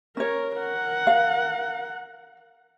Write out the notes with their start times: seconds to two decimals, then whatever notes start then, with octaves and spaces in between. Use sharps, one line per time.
0.17 C#4 A#4 C#5
0.57 A#4 F#5
1.07 F5